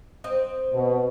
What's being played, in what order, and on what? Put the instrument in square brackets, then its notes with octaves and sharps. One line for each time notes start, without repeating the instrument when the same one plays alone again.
[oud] C4 D#5
[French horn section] B2